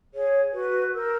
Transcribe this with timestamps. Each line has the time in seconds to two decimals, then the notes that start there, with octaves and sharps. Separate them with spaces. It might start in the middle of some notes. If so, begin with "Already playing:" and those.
0.14 G#4 C#5
0.51 F#4 B4
0.94 A#4 E6 G6